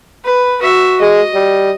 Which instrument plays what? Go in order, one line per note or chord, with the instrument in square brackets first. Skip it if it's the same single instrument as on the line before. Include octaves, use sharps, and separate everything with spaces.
[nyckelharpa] B4
F#4 E5
[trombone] G#3 [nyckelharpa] D#5
[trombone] G3